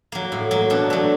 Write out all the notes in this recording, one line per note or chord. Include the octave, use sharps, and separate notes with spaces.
F#3 A#3
A2
F#3 A#3
B2 D4
F#3 A3